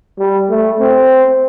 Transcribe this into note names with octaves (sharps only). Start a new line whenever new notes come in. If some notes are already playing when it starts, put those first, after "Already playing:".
G3
A3
C4